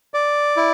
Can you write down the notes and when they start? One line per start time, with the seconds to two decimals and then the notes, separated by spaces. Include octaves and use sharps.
0.14 D5
0.57 E4